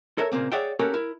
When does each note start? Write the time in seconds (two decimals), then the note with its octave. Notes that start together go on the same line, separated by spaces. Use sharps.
0.18 A4 A#4 C#5 E5
0.32 A#2 C#3 A#3 C4
0.52 G#4 C#5 D5 E5 F#5 G5
0.79 A#3 C#4 F#4 G4 A4 A#4
0.94 E4 A#4